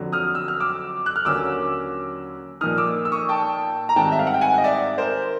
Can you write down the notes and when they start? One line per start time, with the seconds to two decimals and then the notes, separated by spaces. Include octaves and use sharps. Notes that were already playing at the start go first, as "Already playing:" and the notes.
Already playing: F2 D3 F#3
0.12 D#6 F6
0.35 E6
0.48 F6
0.60 D6 E6
1.06 F#6
1.16 F6
1.25 D#2 D3 F#3 A#3 C#4 D6 E6
2.61 A#2 F3 A#3 D#4 D#6 F6
2.77 D6 E6
3.05 E6
3.12 C#6 D#6
3.29 G5 A5
3.89 A#5
3.96 G#2 D#3 G3 C4 G5 A5
4.12 E5
4.19 F5
4.27 F#5
4.34 G5
4.41 F#5 G#5
4.58 D#5
4.64 D5 E5
4.98 A#4 C5